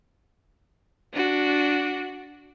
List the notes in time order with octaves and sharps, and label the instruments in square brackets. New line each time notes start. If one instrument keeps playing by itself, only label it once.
[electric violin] D4 F#4